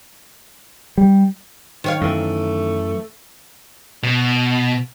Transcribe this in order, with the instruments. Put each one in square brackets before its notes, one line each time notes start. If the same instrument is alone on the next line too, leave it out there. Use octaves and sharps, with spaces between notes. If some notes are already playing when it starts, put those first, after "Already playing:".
[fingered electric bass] G3
[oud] D#3 C#5 F5
[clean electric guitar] F#2 E3 [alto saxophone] A3
[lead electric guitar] B2